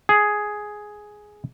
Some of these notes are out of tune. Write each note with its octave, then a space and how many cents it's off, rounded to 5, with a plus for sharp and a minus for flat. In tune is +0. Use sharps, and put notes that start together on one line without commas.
G#4 +5